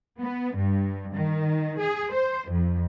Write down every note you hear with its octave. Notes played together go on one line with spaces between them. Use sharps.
B3
G2
D#3
G#4
C5
F2